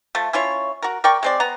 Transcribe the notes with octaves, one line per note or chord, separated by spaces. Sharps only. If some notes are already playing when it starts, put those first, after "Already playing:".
F3 A3
C#4 E4 F4 C#5
F#4 A#4
A#4 D5 G5 C#6
G#3 C4 D5
B3 A#5